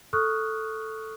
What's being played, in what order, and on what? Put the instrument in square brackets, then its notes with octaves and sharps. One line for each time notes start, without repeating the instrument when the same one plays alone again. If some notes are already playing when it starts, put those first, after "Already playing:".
[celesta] A4 C#6 D#6 F6 F#6